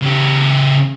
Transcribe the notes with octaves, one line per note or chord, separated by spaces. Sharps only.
C#3 G4